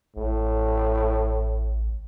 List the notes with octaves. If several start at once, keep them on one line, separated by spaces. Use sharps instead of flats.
A1 A2